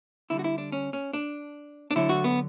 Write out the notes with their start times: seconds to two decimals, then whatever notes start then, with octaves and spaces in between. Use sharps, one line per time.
0.30 D3 G3 E4
0.39 F#4
0.44 E4
0.58 D4
0.72 C#4
0.93 C#4
1.13 D4
1.91 D4
1.96 D3 F#3 A3 E4
2.09 F#4
2.24 B3